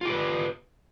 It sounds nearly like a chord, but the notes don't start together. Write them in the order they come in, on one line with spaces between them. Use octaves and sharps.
F4 G4 B4